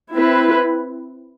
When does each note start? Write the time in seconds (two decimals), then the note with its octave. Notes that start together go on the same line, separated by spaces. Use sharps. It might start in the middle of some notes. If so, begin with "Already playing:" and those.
0.15 C4 E4 B4